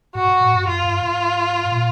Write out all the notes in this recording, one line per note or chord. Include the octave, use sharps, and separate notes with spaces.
G#2 F#4
G#2
A2
G2
F#2 F4
G2
G#2
A#2